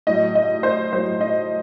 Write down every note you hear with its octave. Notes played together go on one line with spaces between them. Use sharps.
A2 F#3 D#5
D#5
C5
A2 F#3 C5
D#5